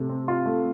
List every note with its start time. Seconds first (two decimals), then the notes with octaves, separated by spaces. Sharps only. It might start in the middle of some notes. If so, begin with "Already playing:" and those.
Already playing: C3 A3
0.09 C4
0.28 F4
0.46 A3